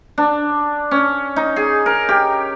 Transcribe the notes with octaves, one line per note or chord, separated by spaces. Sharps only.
D4
C#4
D#4
G#4
A#4
G4